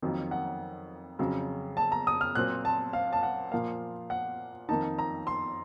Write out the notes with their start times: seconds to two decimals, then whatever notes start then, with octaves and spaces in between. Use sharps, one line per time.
0.02 F2 D#3 F#3 A#3
0.31 F#5
1.19 F2 C#3 F#3
1.77 A5
1.92 A#5
2.07 D#6
2.21 F6
2.35 A#2 F#3 C4 F#6
2.65 A5
2.93 F5
3.13 A5
3.23 F#5
3.52 A#2 F3 A#3 F5
4.10 F#5
4.69 F2 D#3 A#3 D#4 A5
4.99 A#5
5.27 C6